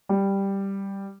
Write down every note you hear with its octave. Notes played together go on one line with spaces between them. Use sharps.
G3